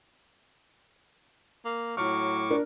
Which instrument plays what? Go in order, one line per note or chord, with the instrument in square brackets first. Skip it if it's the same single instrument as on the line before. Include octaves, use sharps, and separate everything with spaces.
[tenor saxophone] A#3
[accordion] A2 C#6 D6 [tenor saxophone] F#3 [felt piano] F6
[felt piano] D4 A#4